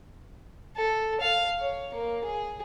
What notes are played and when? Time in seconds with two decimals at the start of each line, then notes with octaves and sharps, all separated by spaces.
0.76 A4
1.20 F5
1.59 C#5
1.94 A#3
2.24 G#4